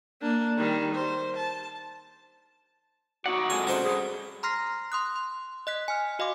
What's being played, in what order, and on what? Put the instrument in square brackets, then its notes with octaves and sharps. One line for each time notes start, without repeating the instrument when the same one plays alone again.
[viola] A#3 D4
D#3 G3
C5
A5
[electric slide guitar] F#3 D#4 D5 [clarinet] F#4 [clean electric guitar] F#5
[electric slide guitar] F2 G#3 A4 [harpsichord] G#5
[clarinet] C#4 [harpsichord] F#4 C5 D5
[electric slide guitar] G2 [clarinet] G#4
[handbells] A#5 C6 F6 A#6 C7
C6 D#6 F#6
C6
D#5 F#6 B6
G#5 F6
F#4 D#5 F5 C6 D6